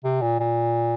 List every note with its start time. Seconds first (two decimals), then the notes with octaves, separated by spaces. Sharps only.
0.04 C3
0.22 A#2
0.40 A#2